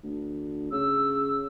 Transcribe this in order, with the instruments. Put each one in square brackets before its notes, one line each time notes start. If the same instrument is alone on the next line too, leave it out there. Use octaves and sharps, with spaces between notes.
[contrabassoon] D2
[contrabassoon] C#3 [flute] E6